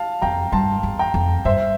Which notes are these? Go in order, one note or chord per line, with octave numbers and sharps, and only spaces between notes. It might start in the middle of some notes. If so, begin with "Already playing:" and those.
Already playing: F5 A5
F2 G5 A#5
G2 A5 C6
E2
G5 A#5
F2
G2 C5 E5